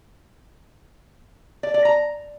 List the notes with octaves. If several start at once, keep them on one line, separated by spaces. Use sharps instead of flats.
D5
D5
A#5